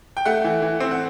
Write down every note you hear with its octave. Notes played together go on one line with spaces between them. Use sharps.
G5
A3 F#5
E3
E3
C4
F#5